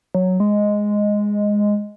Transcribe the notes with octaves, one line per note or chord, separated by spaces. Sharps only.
F#3
G#3